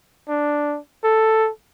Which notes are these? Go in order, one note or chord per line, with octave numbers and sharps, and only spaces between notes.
D4
A4